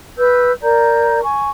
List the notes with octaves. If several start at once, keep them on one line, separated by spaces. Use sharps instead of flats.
B4 E6 G6
A#4 D5 A#5 G6
G#5 C#6